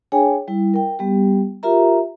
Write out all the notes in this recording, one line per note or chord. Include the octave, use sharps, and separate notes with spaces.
D4 G#4 C#5 G5 G#5
G3 E4
A#4 G5
G3 B3 G4
F4 G4 A#4 E5 A#5